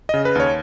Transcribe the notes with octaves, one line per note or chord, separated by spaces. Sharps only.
C#3 D#5
B4
D#2 C#5